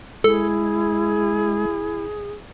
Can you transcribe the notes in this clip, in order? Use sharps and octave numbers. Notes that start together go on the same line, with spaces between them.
G#3 E4 G#4 A4